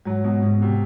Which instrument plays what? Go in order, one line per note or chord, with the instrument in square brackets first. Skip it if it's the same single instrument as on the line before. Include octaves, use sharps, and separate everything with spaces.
[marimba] G#2 G#3 [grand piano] F#3
[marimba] G#2 G#3 [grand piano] B2
[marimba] G#2 G#3 [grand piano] B2
[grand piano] C3